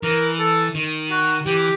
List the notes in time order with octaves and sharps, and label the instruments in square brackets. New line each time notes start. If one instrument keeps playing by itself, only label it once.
[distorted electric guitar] E3 [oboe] A#4
[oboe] A4
[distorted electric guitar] D#3
[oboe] F#4
[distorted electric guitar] E3 [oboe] G4